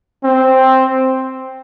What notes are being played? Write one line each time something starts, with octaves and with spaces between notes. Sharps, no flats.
C4